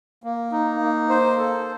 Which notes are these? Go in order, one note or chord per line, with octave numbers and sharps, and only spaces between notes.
A#3
D#4
A#3
C5
A4